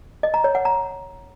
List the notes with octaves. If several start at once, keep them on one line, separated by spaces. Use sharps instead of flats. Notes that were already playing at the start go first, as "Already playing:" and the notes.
D#5
A#5
C#5
F#5
A#5